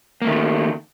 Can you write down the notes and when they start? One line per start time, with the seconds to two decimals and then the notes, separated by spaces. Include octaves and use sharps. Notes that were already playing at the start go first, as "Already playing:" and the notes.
0.22 A#3
0.25 A3
0.27 D#3